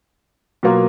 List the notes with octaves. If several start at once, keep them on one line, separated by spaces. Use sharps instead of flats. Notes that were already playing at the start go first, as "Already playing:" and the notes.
B2 F#3 A#3 F4 A#4